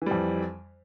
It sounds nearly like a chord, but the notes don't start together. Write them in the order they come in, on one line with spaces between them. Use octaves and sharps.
E3 G3 F2